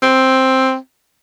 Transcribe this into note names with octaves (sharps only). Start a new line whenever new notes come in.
C4